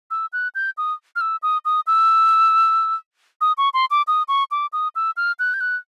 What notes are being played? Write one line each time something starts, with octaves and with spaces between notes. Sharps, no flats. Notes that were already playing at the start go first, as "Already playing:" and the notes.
E6
F#6
G6
D#6
F6
E6
D#6
D#6
E6
D#6
C#6
C6
D6
D#6
C#6
D6
D#6
E6
F6
F#6
G6
F#6